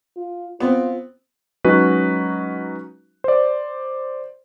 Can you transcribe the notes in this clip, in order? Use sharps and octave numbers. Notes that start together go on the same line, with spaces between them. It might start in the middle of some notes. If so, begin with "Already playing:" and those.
F4
B3 C4 F4
F#3 G#3 C#4 D#4 F#4 B4
C5 D5